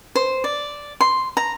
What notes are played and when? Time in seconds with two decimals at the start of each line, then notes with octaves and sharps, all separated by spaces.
0.15 C5
0.44 D5
1.01 C6
1.37 A#5